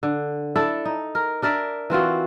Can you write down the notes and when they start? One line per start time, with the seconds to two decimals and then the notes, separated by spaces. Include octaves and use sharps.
0.03 D3
0.56 D4 E4 A4
0.85 D#4
1.15 A#4
1.42 D4 A#4 D5 E5
1.90 E3 C4 F4 F#4